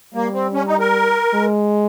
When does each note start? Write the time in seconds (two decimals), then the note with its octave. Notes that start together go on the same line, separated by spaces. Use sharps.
0.14 G3 A#3
0.33 C4
0.53 C#4
0.67 D#4
0.80 A#4
1.34 G#3